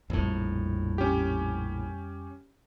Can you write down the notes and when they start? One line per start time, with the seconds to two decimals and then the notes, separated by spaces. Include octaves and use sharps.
0.10 A#1 F2 A2 G3
0.98 C#4 G4